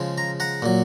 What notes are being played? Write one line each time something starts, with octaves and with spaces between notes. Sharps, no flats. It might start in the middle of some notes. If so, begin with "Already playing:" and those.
Already playing: C#3 F3 G#3
A#5
F#5 A#5
A#2 F#3